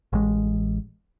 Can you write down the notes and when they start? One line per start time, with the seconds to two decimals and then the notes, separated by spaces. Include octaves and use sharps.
0.13 A1 G#3